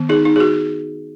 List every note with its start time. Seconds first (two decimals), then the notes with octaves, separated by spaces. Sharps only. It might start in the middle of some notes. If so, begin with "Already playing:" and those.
Already playing: D#3 B3
0.09 D#4 G#4
0.25 D#4
0.36 G#4
0.40 F#4